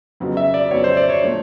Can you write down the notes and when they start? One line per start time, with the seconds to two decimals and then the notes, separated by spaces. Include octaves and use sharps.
0.20 F2 C#3 F#3 B3
0.37 E5
0.54 D5
0.71 F2 C#3 F#3 B3 C#5
0.84 C5
0.97 D5
1.10 C#5
1.22 A#2 F3 A3 D4